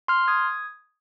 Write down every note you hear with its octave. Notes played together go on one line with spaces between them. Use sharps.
C6 F6
D#6 G#6